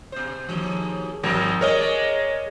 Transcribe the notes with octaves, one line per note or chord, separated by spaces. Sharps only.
B2 C5
D#2 G#2 F3
G#1 F3 A#4
G3 G#3 A#4 C#5 D#5
G#3 D5